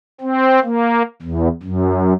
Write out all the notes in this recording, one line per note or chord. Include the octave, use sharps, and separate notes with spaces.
C4
A#3
E2
F#2